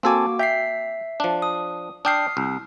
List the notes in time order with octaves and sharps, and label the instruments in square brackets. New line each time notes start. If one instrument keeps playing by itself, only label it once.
[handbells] A#3 F#4 D6 [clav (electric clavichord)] C4 A4 G#5
[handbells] E5 B6 C7 [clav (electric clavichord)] G5
[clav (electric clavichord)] F3 D4
[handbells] D#6
[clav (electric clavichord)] D4 G5 [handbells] D#6 F6 C7
[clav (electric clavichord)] C2